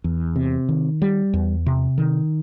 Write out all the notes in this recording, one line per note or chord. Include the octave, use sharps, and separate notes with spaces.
E2
C3
D#3
G3
E2
C3
D#3